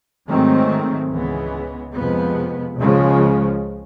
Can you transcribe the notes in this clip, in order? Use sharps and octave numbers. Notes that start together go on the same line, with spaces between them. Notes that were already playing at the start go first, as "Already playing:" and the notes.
G#2 D#3 F#3 A3 C4
C#2 C#3 E3 G#3 B3
F2 C3 F3 G#3 B3
C#2 C#3 F3 G#3